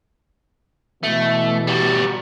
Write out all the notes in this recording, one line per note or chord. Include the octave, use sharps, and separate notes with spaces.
B2 E3 A3
G3 F#4